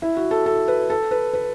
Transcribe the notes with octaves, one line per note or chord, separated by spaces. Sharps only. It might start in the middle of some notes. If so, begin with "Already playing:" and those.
E4
F#4
A4
A4
B4
A4
B4
B4